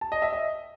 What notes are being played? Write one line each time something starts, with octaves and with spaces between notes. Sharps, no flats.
A5
D#5
E5
D#5